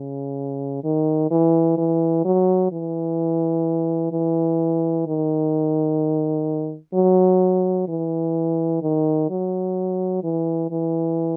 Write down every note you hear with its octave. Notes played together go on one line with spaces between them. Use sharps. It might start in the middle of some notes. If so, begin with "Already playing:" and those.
Already playing: C#3
D#3
E3
E3
F#3
E3
E3
D#3
F#3
E3
D#3
F#3
E3
E3